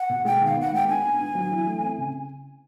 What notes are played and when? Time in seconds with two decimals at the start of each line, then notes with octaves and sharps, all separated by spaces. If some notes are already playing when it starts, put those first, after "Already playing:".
Already playing: F#5
0.10 B2
0.25 G#3 G5
0.41 D#3
0.46 F5
0.56 B3 F#5
0.72 G#3 G5
0.88 D4 G#5
1.04 B3
1.19 D4
1.35 F#3
1.51 E3
1.66 A3
1.82 C4
1.98 C#3